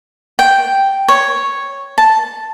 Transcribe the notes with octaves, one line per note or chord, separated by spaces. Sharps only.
G5
C#5
A5